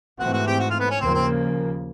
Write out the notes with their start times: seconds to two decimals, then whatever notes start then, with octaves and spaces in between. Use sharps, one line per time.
0.20 G#2 E3 A3 C4 F#4 F#5
0.33 F#4 F#5
0.47 G4 G5
0.59 F#4 F#5
0.70 F4 F5
0.80 B3 B4
0.90 C#4 C#5
1.00 D#2 C#3 F3 A#3 C4 C5
1.13 C4 C5